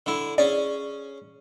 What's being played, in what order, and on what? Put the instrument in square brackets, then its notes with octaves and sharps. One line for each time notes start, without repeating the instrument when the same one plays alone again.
[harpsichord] D3 E4
[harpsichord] C#4 G#4 [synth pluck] D5